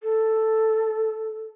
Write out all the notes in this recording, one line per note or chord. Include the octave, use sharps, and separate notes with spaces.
A4